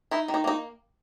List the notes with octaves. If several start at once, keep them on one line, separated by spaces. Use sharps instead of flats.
D#4 E4
D#3
D#4
A#3 D#4